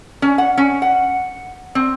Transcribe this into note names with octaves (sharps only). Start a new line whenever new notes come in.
C#4
F#5
C#4
F#5
C4